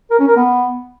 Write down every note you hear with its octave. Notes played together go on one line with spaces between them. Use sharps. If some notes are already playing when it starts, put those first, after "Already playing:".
A#4
C#4
A#4
B3